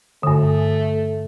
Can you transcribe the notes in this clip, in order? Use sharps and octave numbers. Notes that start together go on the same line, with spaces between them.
G2 D3 A3